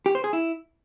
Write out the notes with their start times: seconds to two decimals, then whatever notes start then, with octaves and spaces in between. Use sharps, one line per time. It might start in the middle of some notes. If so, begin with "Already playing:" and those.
0.06 G4
0.15 C5
0.24 G#4
0.33 E4